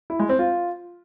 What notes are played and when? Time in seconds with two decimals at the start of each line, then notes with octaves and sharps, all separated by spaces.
0.10 E4
0.20 G#3
0.29 C4
0.39 F4